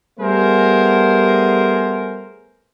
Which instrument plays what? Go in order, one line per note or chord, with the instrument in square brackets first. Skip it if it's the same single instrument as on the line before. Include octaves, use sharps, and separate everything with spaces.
[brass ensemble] G3 A3 B3 G#4 A#4 C5